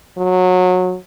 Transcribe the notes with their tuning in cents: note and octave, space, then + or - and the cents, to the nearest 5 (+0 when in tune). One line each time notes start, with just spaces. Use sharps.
F#3 -20